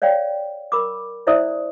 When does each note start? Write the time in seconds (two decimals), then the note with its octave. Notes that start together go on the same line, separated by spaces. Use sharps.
0.02 C#5 D5 F5 G5
0.72 A#4 B5 D6
1.27 D4 E4 C5 D5 E5 D#6